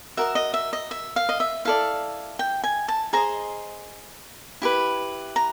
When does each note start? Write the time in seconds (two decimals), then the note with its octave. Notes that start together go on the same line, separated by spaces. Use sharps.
0.17 F#4 A#4 D#5 E5
0.35 D#5
0.54 E5
0.73 D#5
0.91 E5
1.16 F5
1.29 D#5
1.40 E5
1.65 E4 A4 D5 F5
2.39 G5
2.64 G#5
2.88 A5
3.13 G#4 C5 D#5 A#5
4.62 E4 G4 B4
5.36 A#5